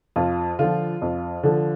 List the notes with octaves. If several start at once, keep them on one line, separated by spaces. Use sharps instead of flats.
F2 F4
D3 F3 F4
F2
D3 F3